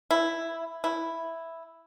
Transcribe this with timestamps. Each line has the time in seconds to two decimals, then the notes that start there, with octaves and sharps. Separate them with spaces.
0.11 E4
0.84 E4